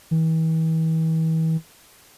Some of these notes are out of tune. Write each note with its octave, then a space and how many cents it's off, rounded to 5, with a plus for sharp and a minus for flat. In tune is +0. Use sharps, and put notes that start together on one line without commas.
E3 -40